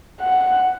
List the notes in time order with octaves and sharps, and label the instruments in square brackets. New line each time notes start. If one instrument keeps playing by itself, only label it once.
[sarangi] F#5